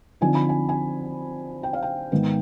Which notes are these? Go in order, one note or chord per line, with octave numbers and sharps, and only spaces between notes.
D3 F3 C4 D#4 G#5
B5
G#5
G#5
G5
F5
G5
G#2 D#3 B3